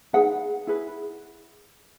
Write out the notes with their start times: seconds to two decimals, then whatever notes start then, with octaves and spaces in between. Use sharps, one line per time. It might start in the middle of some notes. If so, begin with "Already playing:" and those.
0.13 D#4 G#4 B4 F#5
0.67 E4 G#4 B4